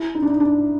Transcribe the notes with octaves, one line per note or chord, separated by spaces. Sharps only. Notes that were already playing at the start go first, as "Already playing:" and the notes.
Already playing: E4
D#4
D4
D#4
D4